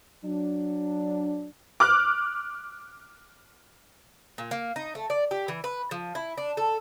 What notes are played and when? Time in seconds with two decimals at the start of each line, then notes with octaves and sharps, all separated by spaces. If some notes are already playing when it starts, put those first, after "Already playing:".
0.24 F#3 D4
1.80 D6 F6 F#6
4.38 A#2
4.51 A#3
4.76 D#4
4.95 A3
5.10 D5
5.31 G4
5.48 E3
5.64 B4
5.91 F3
6.15 E4
6.37 D4
6.57 A4